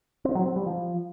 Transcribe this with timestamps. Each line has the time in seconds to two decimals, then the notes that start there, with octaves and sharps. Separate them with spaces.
0.25 C4
0.35 F#3
0.46 C4
0.56 G3
0.66 F3